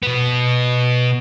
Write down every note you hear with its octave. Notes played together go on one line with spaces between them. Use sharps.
B2 B3